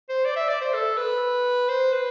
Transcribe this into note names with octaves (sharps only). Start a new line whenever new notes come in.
C5
D5
E5
D5
C5
A4
B4
C5
B4